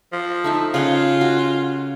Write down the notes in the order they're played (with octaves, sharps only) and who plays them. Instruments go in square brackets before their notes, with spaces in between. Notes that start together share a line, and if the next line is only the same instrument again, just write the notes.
[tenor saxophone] F3
[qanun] A3 D#4 E5
[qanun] C#3 F#5 C6 [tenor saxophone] F4
[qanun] F#4